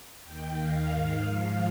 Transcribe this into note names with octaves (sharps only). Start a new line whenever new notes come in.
D#2 D#3 G5
D#2 D#3 F5
G#2 D#3
G#2 F3 F5